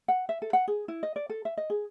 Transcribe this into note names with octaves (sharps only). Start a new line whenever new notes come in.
F#5
E5
A4
F#5
G#4
E4
D#5
D5
A4
E5
D#5
G#4